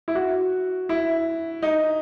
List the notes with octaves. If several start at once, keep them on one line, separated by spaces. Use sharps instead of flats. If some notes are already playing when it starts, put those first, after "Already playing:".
E4
F#4
E4
D#4